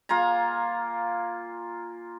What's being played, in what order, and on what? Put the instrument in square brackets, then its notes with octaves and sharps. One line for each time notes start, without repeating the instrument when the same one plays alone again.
[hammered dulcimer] A#3 F4 G#5 A#5